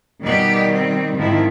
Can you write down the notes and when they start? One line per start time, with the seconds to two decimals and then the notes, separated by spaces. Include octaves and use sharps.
0.23 B2 D#3 G3 G4
0.73 C4
1.17 G#2 D#3 F3 C4 E4